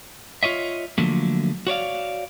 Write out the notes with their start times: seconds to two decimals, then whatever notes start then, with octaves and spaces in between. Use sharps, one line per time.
0.43 F4 C#5 D#5 E5
0.98 D3 F3 F#3 A3 A#3
1.67 F#4 C#5 D5 F5